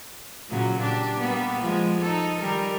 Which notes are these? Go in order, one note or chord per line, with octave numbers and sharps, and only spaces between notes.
A#2 C#3 F#3
D4 G4
G3 A#3 B3
F3 G#3
D#4 A4
D#3 G3 A#4